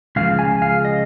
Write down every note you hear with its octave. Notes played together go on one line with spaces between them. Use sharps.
C#2 C#3 F3 F5
G#5
F5
D#5